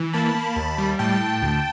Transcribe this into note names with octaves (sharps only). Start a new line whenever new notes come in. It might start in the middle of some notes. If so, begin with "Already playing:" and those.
Already playing: E3
A#3 A5 B5
A#3
D#2
G3
A2 G5 A5
A2
D2